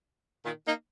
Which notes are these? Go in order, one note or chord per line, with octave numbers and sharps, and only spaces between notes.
A#2 D#3
A#3 D#4